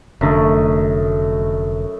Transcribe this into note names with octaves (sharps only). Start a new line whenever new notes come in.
F1 F#2 D3 A3 D#5